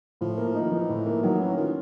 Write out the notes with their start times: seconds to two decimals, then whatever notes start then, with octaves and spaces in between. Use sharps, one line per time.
0.21 A2 F3
0.38 A#3
0.55 D#4
0.61 D#3
0.72 E3 F3
0.89 A2
1.06 A#3
1.23 D#3 F#3
1.40 E3 C#4
1.57 D#3 F4